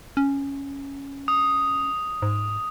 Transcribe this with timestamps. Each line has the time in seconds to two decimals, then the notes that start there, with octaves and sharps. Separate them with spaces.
0.17 C#4
1.28 D#6
2.22 G#2